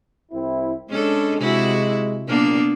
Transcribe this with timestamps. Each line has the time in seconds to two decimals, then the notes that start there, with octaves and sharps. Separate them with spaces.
0.32 C2 C4 E4
0.89 G#3 C#4 D4 A4
1.39 C3 G#3 E4 F#4
2.27 F#1 A#2 A#3 B3 D4